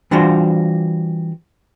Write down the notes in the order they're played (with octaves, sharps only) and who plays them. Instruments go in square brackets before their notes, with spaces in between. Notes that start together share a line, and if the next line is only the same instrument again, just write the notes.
[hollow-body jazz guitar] E3 G3 D4 F4 F#4 C5